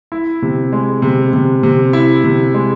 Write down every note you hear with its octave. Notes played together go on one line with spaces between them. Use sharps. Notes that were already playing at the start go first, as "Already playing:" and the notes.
E4
C3
G#3
C3
C3
C3
E4
C3
G#3